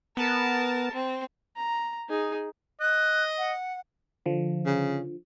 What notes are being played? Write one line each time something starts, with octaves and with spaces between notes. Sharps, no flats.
B3 A#4 A5
C4
A#5
D#4 G#4
D#5 F#6
F#5
D3 F3
C#3